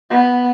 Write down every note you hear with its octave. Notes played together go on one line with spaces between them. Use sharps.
B3